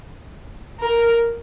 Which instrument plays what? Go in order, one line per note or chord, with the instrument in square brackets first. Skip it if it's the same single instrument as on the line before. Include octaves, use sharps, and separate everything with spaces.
[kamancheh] A#4